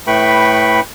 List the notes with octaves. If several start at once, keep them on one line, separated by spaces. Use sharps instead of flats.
A2 A3 B4 G5 B5 C#6